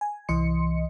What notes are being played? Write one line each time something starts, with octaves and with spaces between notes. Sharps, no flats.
G#5
C2 E3 D#5 C6 C#7